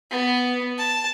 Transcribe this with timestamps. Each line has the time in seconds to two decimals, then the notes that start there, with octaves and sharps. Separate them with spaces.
0.11 B3
0.78 A5